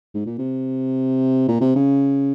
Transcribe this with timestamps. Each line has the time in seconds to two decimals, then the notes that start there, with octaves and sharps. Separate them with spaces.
0.14 G#2
0.26 A#2
0.38 C3
1.48 A#2
1.61 C3
1.75 C#3